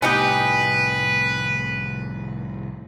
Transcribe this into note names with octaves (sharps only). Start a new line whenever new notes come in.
C2 A2 B3 D#4 G4 B4 G#5 D#6